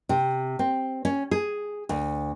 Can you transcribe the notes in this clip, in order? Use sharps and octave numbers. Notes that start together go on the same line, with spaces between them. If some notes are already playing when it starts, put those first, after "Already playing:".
C3
C4
C#4
G#4
D2